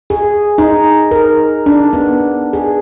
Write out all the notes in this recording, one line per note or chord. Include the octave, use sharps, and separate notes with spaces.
G#4
D#4
A#4
D4
B3
G#4